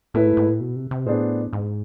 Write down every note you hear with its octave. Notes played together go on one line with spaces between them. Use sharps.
A2 A3 E4 B4
G#2
G#2
A2
B2
C3
C3
A2 B3 D4 G#4 C5
G#2